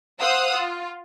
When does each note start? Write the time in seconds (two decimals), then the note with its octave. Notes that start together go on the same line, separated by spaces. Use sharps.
0.20 C5 F5 F#5 D#6 E6
0.54 F4